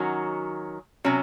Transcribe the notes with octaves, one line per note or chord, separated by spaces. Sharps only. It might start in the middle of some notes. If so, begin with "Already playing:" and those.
Already playing: D#3 F#3 C#4 F#4
C3 F#3 C#4